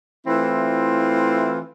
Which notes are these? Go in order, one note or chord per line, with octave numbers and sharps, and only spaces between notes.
E3 A3 C4 E4 F4